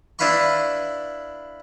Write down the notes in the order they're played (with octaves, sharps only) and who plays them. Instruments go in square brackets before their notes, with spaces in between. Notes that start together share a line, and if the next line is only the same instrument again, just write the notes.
[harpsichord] D4 E4 B4 F5 B5 C#6